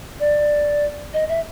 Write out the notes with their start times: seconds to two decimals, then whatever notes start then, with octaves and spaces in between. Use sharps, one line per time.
0.20 D5
1.14 D#5
1.29 E5